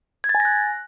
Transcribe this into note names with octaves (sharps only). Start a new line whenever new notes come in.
G#6
A6
G#5
A#6
F#6